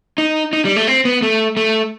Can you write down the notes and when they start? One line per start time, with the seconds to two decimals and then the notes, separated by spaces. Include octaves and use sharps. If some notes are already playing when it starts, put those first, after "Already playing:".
0.18 D#4
0.53 D#4
0.65 G3
0.76 A3
0.88 C4
1.05 B3
1.22 A3
1.57 A3